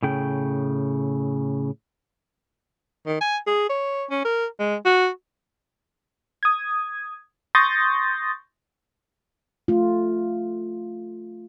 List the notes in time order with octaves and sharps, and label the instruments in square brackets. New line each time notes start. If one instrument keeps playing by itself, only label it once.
[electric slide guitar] A2 C#3 G5
[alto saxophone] D#3
G#5
G#4
C#5
C#4
A#4
G#3
F#4
[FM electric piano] D#6 G#6
C6 C#6 D#6 G6 A6 A#6
[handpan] A3 F4